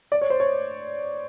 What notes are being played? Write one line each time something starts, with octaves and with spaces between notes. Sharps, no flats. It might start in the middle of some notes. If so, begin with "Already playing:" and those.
D5
C#5
C5
C#5